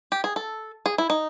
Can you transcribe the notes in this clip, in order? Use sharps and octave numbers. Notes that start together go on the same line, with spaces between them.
G4
G#4
A4
G#4
E4
D#4